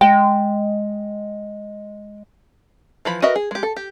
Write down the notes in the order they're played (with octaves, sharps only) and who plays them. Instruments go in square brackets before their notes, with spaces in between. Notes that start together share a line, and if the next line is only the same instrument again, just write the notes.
[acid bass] G#3 [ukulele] G5
[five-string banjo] E3 F3 B5
F#4 A#4 B4 D#5 E5
G#4
G#3 G4
A4
G4